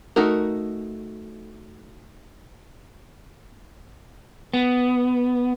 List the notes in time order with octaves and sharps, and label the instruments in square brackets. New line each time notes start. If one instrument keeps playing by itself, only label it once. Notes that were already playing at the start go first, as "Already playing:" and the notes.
[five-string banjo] A3 D#4 F#4 A#4
[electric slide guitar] B3